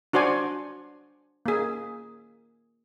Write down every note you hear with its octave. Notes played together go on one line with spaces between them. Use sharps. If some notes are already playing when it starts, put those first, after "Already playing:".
D4 F#4 C5 D5 G#5
A#3 G#4